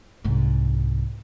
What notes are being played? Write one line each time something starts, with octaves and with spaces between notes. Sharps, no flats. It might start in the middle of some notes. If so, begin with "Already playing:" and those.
C2 G#2